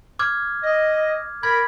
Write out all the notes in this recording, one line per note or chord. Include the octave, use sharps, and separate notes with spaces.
D6 F6 G#6
D#5
A#4 B5 G#6